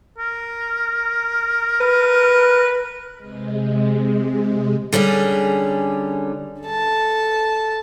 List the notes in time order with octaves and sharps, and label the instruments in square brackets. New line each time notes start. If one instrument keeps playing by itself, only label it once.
[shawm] A#4
[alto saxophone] B4
[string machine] C3 G#3
[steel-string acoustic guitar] D3 G3 C#4 G#4
[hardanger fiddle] A4 A5